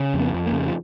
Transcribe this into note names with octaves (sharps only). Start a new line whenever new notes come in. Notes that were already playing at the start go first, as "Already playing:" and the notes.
Already playing: C#3
F2
B3
F2
A#3
C#3
F3